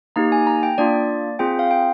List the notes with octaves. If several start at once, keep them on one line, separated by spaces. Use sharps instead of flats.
A#3 D#4 G4 A#5
G#5
A#5
G5
A#3 D4 F4 D5
C4 F4 G#4 G5
F5
G5